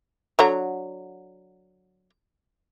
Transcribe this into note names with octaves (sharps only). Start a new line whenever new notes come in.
D3 F#3 A#5